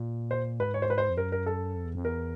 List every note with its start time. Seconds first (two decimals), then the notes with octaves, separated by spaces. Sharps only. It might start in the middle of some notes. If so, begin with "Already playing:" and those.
Already playing: A#2
0.31 C5
0.60 G#2 B4
0.74 C#5
0.82 C5
0.90 B4
0.98 C5
1.10 F2
1.17 F#2 A#4
1.32 A#4
1.46 A4
1.76 F2
1.85 E2
1.95 F2
2.05 E2 A#4